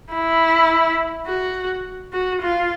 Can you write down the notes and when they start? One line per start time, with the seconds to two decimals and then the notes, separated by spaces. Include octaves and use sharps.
0.13 E4
1.27 F#4
2.13 F#4
2.41 F4